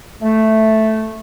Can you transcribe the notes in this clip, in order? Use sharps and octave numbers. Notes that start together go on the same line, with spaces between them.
A3